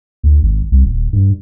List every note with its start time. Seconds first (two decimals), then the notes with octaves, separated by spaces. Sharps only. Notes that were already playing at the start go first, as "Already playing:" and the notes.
0.24 D2
0.43 G#1
0.72 C2
0.86 D#1
1.13 G2